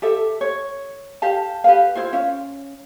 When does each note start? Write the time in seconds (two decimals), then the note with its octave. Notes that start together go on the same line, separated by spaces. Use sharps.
0.02 G4 A4 E5
0.41 C#5
1.22 G4 F5 A5
1.64 G4 B4 F5
1.95 E4 F4 C5
2.13 C#4 F5